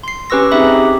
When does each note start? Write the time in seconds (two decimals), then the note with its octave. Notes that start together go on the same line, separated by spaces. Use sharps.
0.03 C6 C7
0.30 C#4 G4 B4 C#6 E6 A#6
0.51 C4 D#4 G4 G#4 E5 B5
0.75 G4